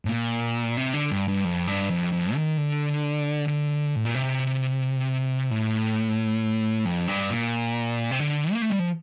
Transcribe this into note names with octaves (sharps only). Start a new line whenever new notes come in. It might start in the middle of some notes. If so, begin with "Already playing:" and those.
A2
A#2
C3
D3
G2
G2
F2
G2
F2
F2
D#3
D3
D3
A2
A#2
C3
A2
F2
G2
A#2
C3
D3
A#3
A3
G3
F3